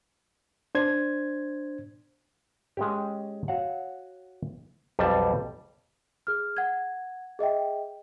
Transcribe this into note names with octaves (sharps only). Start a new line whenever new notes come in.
D4 C5 G#6
G#3 C#4 G4
F#4 C#5 F5 F#5
B1 F2 G3 A5
G#4 F6
F#5 G#6
G#4 D#5 E5 G5